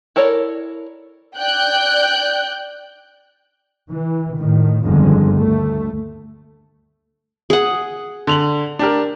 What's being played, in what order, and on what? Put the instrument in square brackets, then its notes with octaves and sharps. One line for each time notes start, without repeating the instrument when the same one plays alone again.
[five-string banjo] E4 A4 A#4 C#5 D5
[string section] D5 G5 F#6 G6
[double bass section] E3
A2 D#3
G1 F2 D3 D#3 G#3
D2 A3
[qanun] G#4 F#5
[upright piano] D3 F7 F#7
D4 G4 A#4